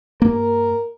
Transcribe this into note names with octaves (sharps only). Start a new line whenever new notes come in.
G2 A#3 A#4